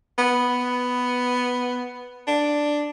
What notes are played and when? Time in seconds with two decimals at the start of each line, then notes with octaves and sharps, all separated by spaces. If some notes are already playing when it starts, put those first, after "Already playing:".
0.18 B3
2.27 D4